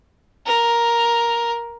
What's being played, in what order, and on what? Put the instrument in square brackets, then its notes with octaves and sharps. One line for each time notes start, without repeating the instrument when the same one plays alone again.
[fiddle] A#4